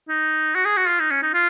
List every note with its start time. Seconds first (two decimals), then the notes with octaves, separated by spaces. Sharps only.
0.09 D#4
0.55 F#4
0.65 G#4
0.77 F#4
0.88 F4
1.00 D#4
1.11 C#4
1.22 D#4
1.34 F4